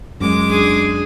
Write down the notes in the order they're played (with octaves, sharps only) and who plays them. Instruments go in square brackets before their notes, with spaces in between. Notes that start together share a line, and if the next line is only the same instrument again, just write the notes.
[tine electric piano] F#2 [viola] G#3 D6
[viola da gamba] D4 G#4